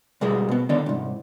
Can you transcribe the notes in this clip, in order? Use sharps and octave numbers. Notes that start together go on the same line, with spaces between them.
B2 G3 G#3 G#4 A#4
B2 B3
D3 D#3 B3 D5
C2 G#2